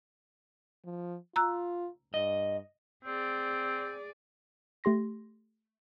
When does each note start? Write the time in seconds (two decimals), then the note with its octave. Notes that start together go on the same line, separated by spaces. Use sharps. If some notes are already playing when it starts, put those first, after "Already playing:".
0.85 F3
1.36 F4 A#5 E6 F#6
2.14 G2 D#5
3.05 C4 G#4 D5
4.84 A3 G4 C6 A#6